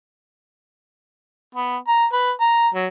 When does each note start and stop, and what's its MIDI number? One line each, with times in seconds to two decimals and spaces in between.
1.55 1.77 59
1.87 2.05 82
2.12 2.31 71
2.40 2.68 82
2.74 2.87 54